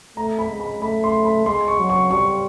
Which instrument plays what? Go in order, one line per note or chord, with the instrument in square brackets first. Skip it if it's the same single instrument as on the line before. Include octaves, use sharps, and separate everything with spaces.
[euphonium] A3 [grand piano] A#5
[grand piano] B5
[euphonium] G#3
[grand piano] B5
[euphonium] A3 [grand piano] B5
[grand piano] C6
B5
[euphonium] G#3 [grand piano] C6
[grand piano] C#6
[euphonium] F#3
[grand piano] C#6
[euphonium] G3 [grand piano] C#6